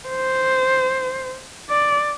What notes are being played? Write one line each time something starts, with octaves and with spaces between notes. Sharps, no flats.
C5
D5